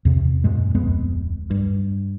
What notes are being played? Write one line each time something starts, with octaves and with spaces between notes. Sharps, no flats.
E2 C3
F#2 A#2 G#3
D1 F2 G#3 B3
G2